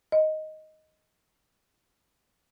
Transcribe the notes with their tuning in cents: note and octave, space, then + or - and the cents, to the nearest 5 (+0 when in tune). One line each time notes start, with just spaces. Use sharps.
D#5 +5